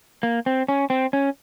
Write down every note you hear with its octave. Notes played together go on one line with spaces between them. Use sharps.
A#3
C4
C#4
C4
C#4